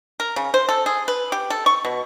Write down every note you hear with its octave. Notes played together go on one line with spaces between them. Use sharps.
A#4
C#3
C5
A4
G#4
B4
G4
A4
C#6
B2